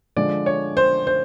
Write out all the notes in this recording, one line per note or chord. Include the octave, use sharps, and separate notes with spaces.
D3 F3 G#3 D5
C#5
C5
C5